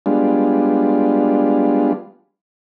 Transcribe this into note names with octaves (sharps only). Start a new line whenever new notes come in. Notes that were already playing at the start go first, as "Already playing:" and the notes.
G3 G#3 B3 D4 F4